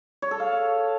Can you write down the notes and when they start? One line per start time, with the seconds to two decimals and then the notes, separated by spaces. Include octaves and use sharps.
0.22 C#5
0.31 A4
0.40 F5